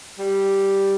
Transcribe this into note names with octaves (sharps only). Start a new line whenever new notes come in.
G3